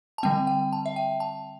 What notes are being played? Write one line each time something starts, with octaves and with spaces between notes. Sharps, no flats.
A5
D3 G3 C4 G5
G5
A5
E5
G5
A5